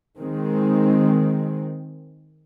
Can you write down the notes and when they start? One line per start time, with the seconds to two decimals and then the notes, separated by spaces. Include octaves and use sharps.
0.18 D#3 G#3 C4